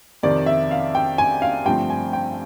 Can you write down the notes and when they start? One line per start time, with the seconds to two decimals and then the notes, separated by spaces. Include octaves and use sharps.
0.23 F2 C3 D#3 D5
0.46 E5
0.71 F5
0.95 G5
1.18 G#5
1.42 F5
1.66 G2 D3 F3 A3 C4 G5
1.90 G#5
2.13 G5